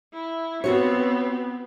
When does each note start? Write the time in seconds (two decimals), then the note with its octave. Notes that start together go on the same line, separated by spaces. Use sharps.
0.13 E4
0.64 B3 C4 F4 F#4 C#5